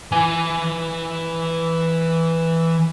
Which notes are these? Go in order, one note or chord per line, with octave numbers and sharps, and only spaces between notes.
E3 G#5